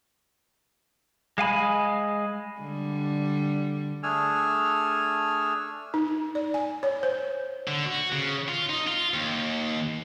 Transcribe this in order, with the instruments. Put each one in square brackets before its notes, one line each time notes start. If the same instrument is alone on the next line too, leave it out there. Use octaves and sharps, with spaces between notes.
[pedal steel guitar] G#3 F5 G#5 B5
[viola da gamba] D3 G3
[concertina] A3 D4 G#4 G#5 E6 F6
[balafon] D#4
D5
G#5
C#5
C5
[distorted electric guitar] D3
F#4
C#3
F4
D#4
F4
D#2